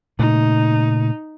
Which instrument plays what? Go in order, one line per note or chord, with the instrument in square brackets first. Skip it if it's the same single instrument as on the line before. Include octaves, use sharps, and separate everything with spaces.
[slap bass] A#2 C#3 A3 [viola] D#4